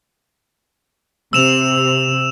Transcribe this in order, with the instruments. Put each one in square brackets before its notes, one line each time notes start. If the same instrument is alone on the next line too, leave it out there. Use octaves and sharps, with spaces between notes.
[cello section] C3 [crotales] E6 E7 F7